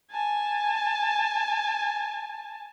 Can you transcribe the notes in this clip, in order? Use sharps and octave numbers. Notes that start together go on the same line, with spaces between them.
G#5 A5